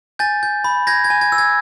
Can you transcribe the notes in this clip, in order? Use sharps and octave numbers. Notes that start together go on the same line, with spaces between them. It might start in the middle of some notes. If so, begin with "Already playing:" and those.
G#5 G6 A6
G6
B5
G6 G#6 A#6
G#6
G#5
G#6
E6
G#6